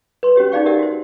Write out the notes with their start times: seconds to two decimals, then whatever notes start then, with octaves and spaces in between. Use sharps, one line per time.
0.23 B4 C6
0.36 C#4 F#4 G4 C#5
0.52 D#4 G#4 D5 F5 G5 C#6
0.66 G4 A#4 D5 E5 F#5
0.79 F#4 C5